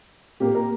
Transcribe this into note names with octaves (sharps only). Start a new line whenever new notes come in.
A#2 A#3 G4
A#4